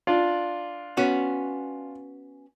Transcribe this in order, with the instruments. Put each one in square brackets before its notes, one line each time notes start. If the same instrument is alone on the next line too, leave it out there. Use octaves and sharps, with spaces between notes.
[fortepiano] D4 F4 D5
[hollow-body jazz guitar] B3 C#4 F#4